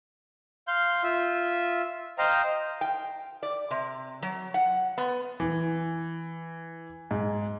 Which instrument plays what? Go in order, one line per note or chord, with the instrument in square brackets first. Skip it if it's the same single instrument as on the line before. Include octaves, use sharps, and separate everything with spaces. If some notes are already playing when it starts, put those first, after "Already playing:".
[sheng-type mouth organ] F5 C6 G6
F4 E5
C5 D#5 F5 G5 A#5
[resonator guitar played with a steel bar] G5
D5
C3
F#3
F#5
B3
[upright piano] E3
G#2